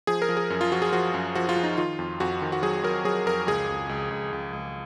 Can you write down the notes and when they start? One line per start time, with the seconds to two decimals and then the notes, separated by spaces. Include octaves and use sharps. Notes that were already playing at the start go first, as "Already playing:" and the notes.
0.07 F3 G#4
0.22 A#4
0.29 F3
0.37 G#4
0.50 F#2
0.61 F4
0.72 F3 F#4
0.82 G#4
0.92 F3 F#4
1.14 F#2
1.35 F3 F#4
1.49 F4
1.56 F3
1.64 D#4
1.78 D#3 F4
1.99 F2
2.20 F2 F#4
2.42 D#3
2.52 F#4
2.63 F#3 G#4
2.84 F#3 A#4
3.05 F#3 G#4
3.26 F2 A#4
3.47 C#2 G#4
3.69 C#2
3.89 C#2
4.11 C#2
4.33 C#2
4.53 C#2